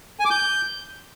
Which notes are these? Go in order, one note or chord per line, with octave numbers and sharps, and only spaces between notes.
G#5
D6
G6